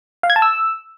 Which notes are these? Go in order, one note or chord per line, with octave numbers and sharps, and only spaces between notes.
F5
G#6
A5
E6